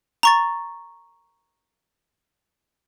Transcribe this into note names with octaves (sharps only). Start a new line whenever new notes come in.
A#5 C#6 A6